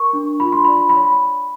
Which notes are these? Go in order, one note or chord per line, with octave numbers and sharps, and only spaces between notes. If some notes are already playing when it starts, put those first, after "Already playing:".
Already playing: A#4 C#6
D4
F4 B5
C6
D5 B5
C6
C#5 B5